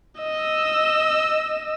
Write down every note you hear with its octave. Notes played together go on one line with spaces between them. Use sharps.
D#5 E6